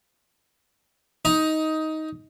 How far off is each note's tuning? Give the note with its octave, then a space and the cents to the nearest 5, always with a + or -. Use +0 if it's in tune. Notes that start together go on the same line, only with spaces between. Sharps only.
D#4 +15